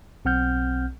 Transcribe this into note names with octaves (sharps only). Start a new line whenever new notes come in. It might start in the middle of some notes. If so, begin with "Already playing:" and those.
B1 C4 F#5 F6 G6